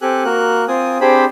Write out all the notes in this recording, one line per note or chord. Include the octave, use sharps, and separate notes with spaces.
C4 G4 A4 G#5 F#6
A#3 F#4 A#4 F#6
C4 F4 G#5 D#6
C4 D4 G4 G#4 C5 B5